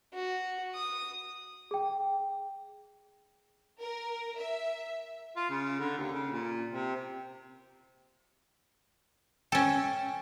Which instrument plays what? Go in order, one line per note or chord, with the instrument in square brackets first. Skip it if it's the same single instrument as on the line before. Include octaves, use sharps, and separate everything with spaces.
[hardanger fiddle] F#4
D#6
[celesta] G#4 G5
[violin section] A#4
E5
[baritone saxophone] F4
C#3
D3
D#2
C#3
A#2
C3
[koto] C#4 A4 [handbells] G5